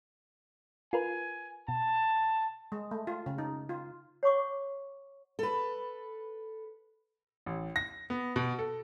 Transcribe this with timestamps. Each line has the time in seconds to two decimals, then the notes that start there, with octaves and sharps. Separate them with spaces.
0.93 F4 A#4 B4 G#5
1.68 B2 A5
2.72 G#3
2.91 A3
3.07 F4
3.26 C#3
3.38 D#4
3.69 F4
4.23 C#5 F#5 C#6 D6
5.39 A4 B4
7.46 A1
7.76 A#6
8.10 B3
8.36 B2
8.59 A4